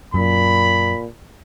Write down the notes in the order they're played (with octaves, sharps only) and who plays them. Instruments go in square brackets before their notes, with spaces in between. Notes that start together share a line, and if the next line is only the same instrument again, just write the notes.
[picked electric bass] F#2 [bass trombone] A#2 [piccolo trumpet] B5